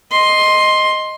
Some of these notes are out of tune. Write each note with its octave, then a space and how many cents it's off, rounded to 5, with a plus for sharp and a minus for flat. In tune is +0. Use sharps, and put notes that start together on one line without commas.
D#5 +0 C6 +10